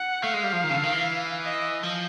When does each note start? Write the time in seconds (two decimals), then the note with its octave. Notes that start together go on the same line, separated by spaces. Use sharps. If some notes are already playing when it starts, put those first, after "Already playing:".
Already playing: F#5
0.23 A3 F5
0.34 G#3
0.44 G3
0.53 F3
0.64 D#3
0.70 C#3
0.73 D3
0.83 D#3
0.93 E3
1.43 D#5
1.83 F3